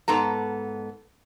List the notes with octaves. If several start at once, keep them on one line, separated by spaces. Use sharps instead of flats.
G#2 B3 A4 A#5